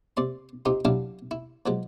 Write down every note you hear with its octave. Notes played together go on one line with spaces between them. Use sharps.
C3 D5 C6
C3 D#4 F4 G4
F#3 G3 D4 E4 F5
E4
F3 F#3 G#3